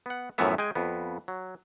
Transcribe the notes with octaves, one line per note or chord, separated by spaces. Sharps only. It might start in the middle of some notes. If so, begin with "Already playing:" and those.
B3 F#5
F#2 A2 E3 F3 B3 E5
G#3 G5 G#5
F2 B3
F#3